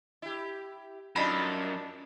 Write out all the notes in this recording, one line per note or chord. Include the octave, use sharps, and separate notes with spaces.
E4 G4
F#2 A3 D4 D#4 F4 B5